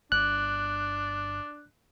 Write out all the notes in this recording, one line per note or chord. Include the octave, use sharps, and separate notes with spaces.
G1 D4 F#6